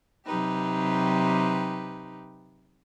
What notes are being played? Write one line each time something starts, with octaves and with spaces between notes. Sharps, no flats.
C3 F#3 D#4 G4 B4